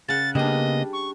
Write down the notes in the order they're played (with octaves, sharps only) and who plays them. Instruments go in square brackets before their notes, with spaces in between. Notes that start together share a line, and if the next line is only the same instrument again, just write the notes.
[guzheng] C#3 F#5 [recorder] A6
[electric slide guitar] C#3 A#3 B3 [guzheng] G3 D4 [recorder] D#5
[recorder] C#6